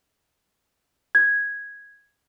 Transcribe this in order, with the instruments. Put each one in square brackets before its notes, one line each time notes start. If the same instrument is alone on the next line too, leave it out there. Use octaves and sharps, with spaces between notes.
[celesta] G#6